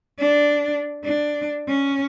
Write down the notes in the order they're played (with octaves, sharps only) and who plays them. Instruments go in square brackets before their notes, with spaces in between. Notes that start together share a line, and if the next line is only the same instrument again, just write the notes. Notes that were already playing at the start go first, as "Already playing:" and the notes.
[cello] D4
D4
C#4